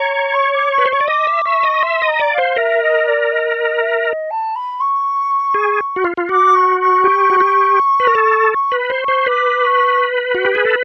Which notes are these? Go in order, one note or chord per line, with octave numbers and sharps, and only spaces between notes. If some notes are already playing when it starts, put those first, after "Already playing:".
Already playing: C#5 A#5
C#6
D6
C#6
B4
C5
C#5 C#6
D5
D#5 D6
E5
E5 C#6
D#5
E5 C6
D#5
A#5
D5
F5
C5
A#4 E5
D#5
D5
D#5
D#5
E5
D#5
A5
B5
C#6
G#4
F#4
F4
F4
F#4 D6
C#6
C#6
G4
F#4
G4
B4
A#4
A4
C#6
B4
B5
C5
C#6
C5
B4 D6
C#6
F#4
G4
G#4
A4